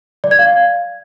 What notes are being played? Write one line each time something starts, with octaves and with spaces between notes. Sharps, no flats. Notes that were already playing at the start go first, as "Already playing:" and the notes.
D5
G#6
F5